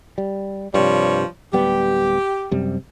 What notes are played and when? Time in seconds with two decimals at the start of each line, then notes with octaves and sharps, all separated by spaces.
0.18 G3
0.74 G2 C3 F3 G3 C#5
1.53 D1 G3 B3 G4
2.51 F#2 C3 G3